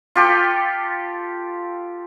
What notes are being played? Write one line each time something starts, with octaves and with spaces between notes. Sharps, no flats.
F4 G4 A4